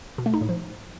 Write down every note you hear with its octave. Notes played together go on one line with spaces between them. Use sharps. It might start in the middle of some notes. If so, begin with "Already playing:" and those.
B2
A3
D#4
A2
F3